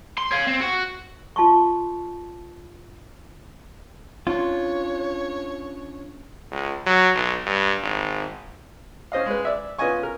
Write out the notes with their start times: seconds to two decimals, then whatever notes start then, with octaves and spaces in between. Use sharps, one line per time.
0.18 C6
0.32 C#5 F5
0.47 C4
0.61 F#4
1.36 F4 A5 C6 C#6
4.27 C#4 D4 F4 C#5
6.52 C#2
6.86 F#3
7.16 B1
7.47 G2
7.83 G#1
9.12 C#4 C5 D#5 F5
9.26 G#3 B4
9.45 D5 E5
9.79 B3 C#4 F4 D#5 G#5 C#6
10.03 A#4